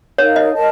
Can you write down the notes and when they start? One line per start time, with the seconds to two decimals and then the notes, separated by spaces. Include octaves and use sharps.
0.18 D#4 A#4 C#5 F5
0.36 D#5
0.54 A#4 D#5 A5